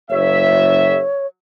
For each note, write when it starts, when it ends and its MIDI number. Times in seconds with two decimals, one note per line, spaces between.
0.10 0.98 30
0.10 1.26 73
0.10 0.98 76